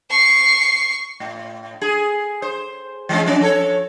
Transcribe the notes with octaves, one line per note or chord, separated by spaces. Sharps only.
C#6 C7
A2
G#4
C5
E3 G#3 C#4
F3 C#4 D4
F3 A4 C#5